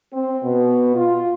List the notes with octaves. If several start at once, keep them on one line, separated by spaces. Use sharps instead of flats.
C4
B2
F4